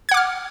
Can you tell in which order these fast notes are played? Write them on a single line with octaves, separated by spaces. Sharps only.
G#6 F#5 D6 F6